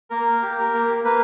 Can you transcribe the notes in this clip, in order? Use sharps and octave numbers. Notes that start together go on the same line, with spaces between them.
A#3 A#4
G4
A#4
A#3
A#3 B4